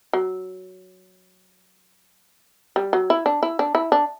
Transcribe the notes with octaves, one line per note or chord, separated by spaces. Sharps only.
F#3
G3
F#3
E4
D4
E4
D4
E4
D4